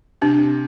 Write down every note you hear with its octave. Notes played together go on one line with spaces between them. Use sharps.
C3 D4